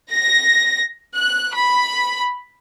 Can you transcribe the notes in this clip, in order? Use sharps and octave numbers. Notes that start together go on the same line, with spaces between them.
A#6
F#6
B5